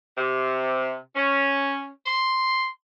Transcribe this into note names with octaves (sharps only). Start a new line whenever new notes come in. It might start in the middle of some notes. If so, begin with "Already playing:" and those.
C3
C#4
C6